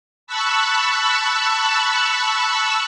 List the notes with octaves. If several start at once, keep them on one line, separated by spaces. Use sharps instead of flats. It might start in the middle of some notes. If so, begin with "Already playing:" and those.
A5 B5 C#6 E6 F#6